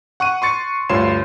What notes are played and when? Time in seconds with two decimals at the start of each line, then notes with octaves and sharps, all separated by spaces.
0.20 F#5 C#6 F#6 D#7
0.42 C6 C#6 A6 C#7
0.89 D2 G2 F4 C#5 C6 E7